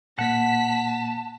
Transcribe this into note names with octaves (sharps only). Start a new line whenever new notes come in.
A#2 A#3 F#5 A5 B6